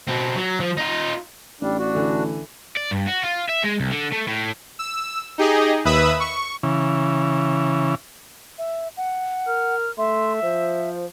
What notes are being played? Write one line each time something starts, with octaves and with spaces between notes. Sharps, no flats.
B2 C4
F#3
F3
D#4 F4
A1 G3 D4
D4 F#4
D3 E3
D5
G2
F#4
F4
E5
G#3
C2
D3
A3
A2
E6
D#4 G4 G#4 D#5
D#2 B4 E5 B5 D#6 E6
C#6
C#3 E3
E5
F#5
A#4 F6
A3 E5 C6
F3 C5